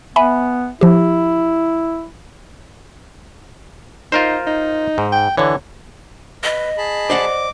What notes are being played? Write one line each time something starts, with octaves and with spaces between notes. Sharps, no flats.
B3 E5 G#5 B5
F3 E4 G4
D#4 F4 A#4 C5
D#4
G#2
G5
D3 E3 C#5
B4 D#5
G#4 A5 B5
C5 D5 F#5 D6